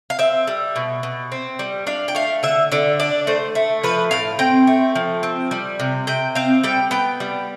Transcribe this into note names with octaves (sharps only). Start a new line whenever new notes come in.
F5
C4 E5
G3
B2
B2
C4
G3
D4 F5
G5
A3 F5
D3 E5
D3 D5
D4 D5
A3 C5
A3
F3 B4
A2 F5
C4 G5
A3
F3
C4
G3
C3
C3 G5
C4 F5
G3 G5
B3 G5
G3